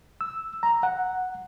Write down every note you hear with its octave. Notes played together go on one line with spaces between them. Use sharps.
E6
A#5
F#5